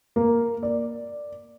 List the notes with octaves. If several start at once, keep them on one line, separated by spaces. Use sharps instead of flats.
A#3
D5